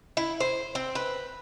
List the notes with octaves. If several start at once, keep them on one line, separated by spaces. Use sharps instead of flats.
E4
C5
C4
B4